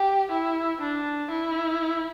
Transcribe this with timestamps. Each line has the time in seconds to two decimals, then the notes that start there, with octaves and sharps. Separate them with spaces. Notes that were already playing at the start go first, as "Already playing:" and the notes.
Already playing: G4
0.31 E4
0.81 D4
1.31 E4